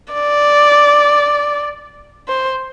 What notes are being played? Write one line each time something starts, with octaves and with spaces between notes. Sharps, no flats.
D5
C5